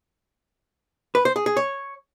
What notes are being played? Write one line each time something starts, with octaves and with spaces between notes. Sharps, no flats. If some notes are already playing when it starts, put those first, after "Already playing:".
B4
C5
G#4
G#4
C#5